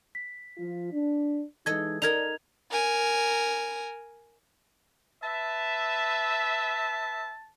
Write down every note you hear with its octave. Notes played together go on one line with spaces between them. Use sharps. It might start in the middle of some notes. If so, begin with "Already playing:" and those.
B6
F3 F4
D4
E3 G#3 D#4 A4 D#5 G#6
D#4 A4 A#4 D5 A#5 G#6 F7
A#4 G#5
B4 E5 A5